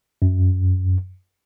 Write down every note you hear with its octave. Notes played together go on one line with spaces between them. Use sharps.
F#2